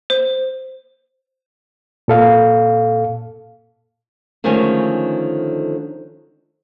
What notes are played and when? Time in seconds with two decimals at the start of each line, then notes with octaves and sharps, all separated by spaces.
0.10 C5
2.08 A#2 A4 F5
4.44 D3 D#3 F3 G#3 A3 C#4